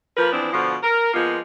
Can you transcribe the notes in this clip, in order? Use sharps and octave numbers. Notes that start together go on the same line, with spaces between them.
F3 A#3 A#4 B4
E3 F3 B3 C4 D4
B2 D3 F3
A#4
F3 G#3 A#3 B3 F4